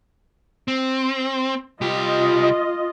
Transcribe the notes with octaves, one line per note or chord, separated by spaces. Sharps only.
C4
C2 F4 G4 D#5